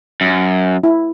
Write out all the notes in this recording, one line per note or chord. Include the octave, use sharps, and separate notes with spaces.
F#2
E4